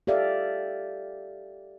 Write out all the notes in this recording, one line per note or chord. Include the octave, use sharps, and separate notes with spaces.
G4 A4 D5 E5 F5